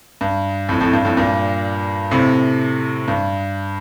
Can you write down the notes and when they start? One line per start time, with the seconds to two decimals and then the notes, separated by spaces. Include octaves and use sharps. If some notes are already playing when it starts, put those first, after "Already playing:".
0.21 G2
0.69 F2 A2
0.81 F2 A2
0.93 G2
1.05 F2 A2
1.17 G2 A#2
2.11 A2 C3
3.08 G2